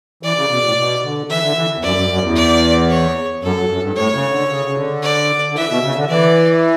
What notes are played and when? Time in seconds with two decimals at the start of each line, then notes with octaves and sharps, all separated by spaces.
0.23 E3 D5
0.37 C#3
0.50 B2
0.63 A2
0.76 B2
1.04 D3
1.30 E3 E5
1.43 D3
1.56 E3
1.77 E2
1.82 F#2 D5
1.96 F#2
2.10 F#2
2.23 E2
2.36 D5
2.90 C#5
3.43 F#2 A4
3.56 F#2
3.70 F#2
3.82 G2
3.96 A2 C#5
4.14 C#3
4.32 D3
4.49 C#3
4.65 C#3
4.76 D3
5.03 D5
5.50 D3
5.56 E3 E5
5.70 B2
5.82 C#3
5.96 D3
6.09 E3 D5